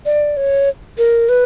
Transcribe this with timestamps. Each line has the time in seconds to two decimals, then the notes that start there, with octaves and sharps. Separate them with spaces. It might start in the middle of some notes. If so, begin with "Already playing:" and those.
0.05 D5
0.37 C#5
0.98 A#4
1.29 B4